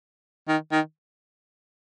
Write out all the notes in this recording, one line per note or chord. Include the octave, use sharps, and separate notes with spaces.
D#3
D#3